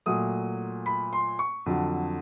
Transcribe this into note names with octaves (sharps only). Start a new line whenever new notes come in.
A#2 F#3 A3 D#6
B5
C6
C#6
F2 D3 F#3